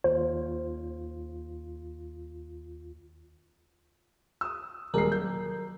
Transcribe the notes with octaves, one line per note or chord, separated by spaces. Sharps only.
D#2 F4 C5
D#6 E6
D#1 F#3 G#3 A#4 C7
G6